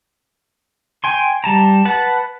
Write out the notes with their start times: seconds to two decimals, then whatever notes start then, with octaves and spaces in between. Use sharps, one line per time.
1.04 G5 G#5 C6
1.44 G3 A5 A#5
1.85 B4 F#5 A5